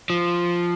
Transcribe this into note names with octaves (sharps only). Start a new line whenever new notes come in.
F3